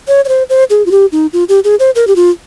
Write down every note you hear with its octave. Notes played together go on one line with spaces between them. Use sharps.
C#5
C#5
C5
C5
G#4
F4
G4
D#4
F4
G4
G#4
C5
A#4
G4
F4